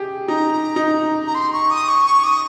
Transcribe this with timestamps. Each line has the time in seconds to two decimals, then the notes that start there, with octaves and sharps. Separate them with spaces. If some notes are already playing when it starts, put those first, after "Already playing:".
Already playing: G4 G#4
0.28 D#4 A#5
0.76 D#4
1.27 A#5
1.35 C6
1.53 C#6
1.71 D#6
1.89 C#6
2.06 C#6
2.24 D#6